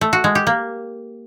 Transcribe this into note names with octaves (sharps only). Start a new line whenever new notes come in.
A3
F#4
G#3
G4
A#3